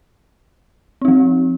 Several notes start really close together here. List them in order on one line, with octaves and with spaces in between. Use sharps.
C4 D#4 F3